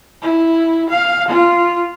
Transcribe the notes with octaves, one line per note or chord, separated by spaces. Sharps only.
E4
F5
F4